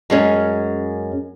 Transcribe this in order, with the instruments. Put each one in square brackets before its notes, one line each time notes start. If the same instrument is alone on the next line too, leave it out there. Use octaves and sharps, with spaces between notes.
[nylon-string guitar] F#2 G#3 C#4